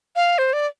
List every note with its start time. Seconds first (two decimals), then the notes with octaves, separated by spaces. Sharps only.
0.16 F5
0.38 C5
0.53 D5